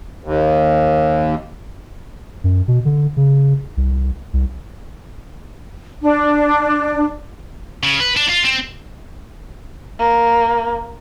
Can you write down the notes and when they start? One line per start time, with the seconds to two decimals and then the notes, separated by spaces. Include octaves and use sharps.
0.24 D#2
2.44 F#2
2.68 B2
2.85 D3
3.17 C#3
3.77 C2
4.33 C2
6.02 D4
7.83 C#3
8.00 B4
8.16 D4
8.29 F4
8.44 C4
9.99 A#3